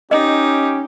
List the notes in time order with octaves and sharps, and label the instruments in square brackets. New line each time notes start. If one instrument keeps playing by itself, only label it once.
[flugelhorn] C#4 [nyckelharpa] D#4 [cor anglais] G4 [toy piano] D#5